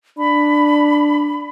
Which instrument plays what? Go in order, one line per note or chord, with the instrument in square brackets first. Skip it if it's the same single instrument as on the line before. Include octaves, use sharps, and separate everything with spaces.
[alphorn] D4 [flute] B5